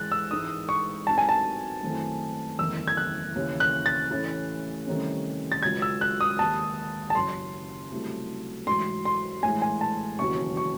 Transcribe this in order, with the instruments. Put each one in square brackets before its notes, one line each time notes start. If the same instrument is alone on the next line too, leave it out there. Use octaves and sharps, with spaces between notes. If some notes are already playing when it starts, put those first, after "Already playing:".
Already playing: [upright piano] G#2 E3 G#3 [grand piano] F#6 A6
[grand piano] E6
[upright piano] G#2 E3 G#3 D#4 [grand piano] D#6
[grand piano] C#6
[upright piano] G#2 F#3 C4 D#4 [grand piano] A5
[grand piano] G#5
A5
[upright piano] F#2 D#3 A3 C4 E4
[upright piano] F#1 E2 D#3 A3 [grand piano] E6
[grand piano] G#6
F#6
[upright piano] D#2 C#3 E3
[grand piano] F#6
A6
[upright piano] A2 E3 A3 C#4 E4
C2 C3 D#3 A3 C#4
[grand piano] A6
[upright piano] C#2 C#3 F#3 [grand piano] G#6
[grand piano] E6
F#6
D#6
[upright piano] D#2 D#3 G#3 [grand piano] A5
[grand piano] A5
[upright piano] F#1 F#2 C#3 [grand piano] C6
[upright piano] C2 C3 F#3 A3
[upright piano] A1 G#2 F#3 [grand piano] C6
[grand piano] C6
[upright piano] A2 E3 G#3 [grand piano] G#5
[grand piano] G#5
A5
[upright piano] E1 D#2 C#3 F#3 [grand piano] C#6
[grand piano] C#6